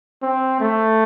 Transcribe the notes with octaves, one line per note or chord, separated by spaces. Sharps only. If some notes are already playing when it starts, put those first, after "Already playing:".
C4
A3